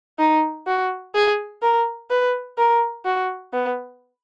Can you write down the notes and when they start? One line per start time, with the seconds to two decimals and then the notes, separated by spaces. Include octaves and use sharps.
0.19 D#4
0.67 F#4
1.15 G#4
1.62 A#4
2.10 B4
2.58 A#4
3.05 F#4
3.53 B3